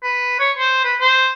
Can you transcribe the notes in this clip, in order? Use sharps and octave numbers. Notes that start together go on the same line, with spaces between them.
B4
C#5
C5
B4
C5